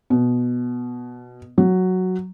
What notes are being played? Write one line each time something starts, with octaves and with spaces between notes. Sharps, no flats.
B2
F#3